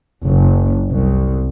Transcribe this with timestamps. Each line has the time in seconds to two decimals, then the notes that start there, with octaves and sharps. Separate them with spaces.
0.25 F#1
0.90 C2